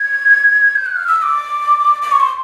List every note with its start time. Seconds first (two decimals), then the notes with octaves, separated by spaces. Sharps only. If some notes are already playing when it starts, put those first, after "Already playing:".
Already playing: G#6
0.76 G6
0.86 F#6
0.96 F6
1.07 E6
1.22 D6
2.02 D6
2.12 C#6
2.20 C6